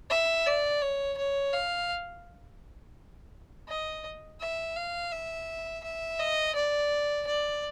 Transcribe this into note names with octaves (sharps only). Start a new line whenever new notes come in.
E5
D5
C#5
C#5
F5
D#5
E5
F5
E5
E5
D#5
D5
D5